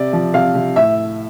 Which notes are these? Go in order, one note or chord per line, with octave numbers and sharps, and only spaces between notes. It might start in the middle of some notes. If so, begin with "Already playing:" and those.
Already playing: C3 D5
F3
C3 F5
C3
A2 E5